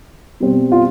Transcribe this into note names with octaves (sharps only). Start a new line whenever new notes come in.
B2 G3 C4
F4